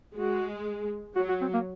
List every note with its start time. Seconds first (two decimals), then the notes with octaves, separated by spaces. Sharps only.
0.15 G#3 F#4
1.16 F#3 F#4
1.29 F#4
1.41 C4
1.54 A#3